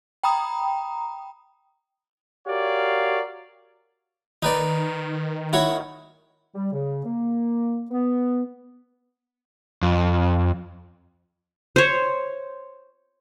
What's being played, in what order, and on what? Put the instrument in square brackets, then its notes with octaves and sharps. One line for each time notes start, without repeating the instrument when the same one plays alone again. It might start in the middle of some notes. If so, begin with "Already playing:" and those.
[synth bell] G5 A#5 B5 D#6
[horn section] F#4 G4 A#4 C#5 D5 F5
[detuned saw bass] D#3 [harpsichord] D#4 B4 D5
[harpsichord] E4 F#4 C#5
[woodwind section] G3
C#3
A#3
B3
[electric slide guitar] F2
[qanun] C5 C#5